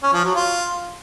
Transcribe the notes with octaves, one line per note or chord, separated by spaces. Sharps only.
C#4
F3
F#3
F4